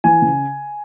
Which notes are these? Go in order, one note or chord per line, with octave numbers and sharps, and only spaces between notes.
E3 G#5
C#3